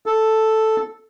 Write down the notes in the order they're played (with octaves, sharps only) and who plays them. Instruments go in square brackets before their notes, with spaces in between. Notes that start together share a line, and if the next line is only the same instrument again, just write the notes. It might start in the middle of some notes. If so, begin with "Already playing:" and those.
[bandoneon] A4